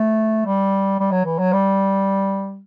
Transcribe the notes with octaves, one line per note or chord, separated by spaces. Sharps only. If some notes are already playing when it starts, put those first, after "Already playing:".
Already playing: A3
G3
G3
F#3
E3
F#3
G3